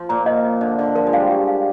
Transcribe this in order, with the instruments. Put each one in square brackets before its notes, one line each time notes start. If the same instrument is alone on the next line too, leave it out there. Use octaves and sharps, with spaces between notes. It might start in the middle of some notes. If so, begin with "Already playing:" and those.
Already playing: [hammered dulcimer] F3
[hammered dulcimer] A#2 [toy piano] A#5
[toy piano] D#5
D#5
[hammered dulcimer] D3 [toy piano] D#5
[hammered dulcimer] D3 [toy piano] D#5
[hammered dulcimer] F3 [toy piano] A#4
[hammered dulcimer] G#3
[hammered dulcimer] G3 [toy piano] F5
[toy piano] G4
F5